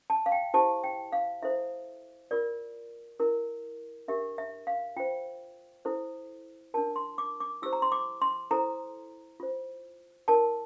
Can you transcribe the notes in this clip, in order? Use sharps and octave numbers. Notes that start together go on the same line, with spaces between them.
A5
F5
G5
E4 G4 C5 A5
G5
F5
E4 A4 C5 E5
F4 A#4 D5
E4 A#4
D4 G4 A#4 E5
E5
F5
F4 C5 G5
E4 A4 C5
D4 F4 A#4 A5
C6
D6
D6
E4 G4 C5 E6
A#5
C6
D6
C6
E4 A4 C5 A#5
F4 C5
E4 A#4 A5